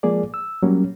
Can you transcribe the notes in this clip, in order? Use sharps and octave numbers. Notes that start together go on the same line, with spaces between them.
F3 G#3 A#3 G#4 D5
E6
F#3 G3 A#3 C#4